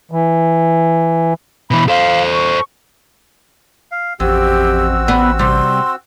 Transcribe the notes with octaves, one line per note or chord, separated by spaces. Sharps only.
E3
B2 E3 B5
A4 C5 F5
C#6
F5
A1 F2 C4 F#4 G4 E6
B3 D5 B5
C3 G3 C6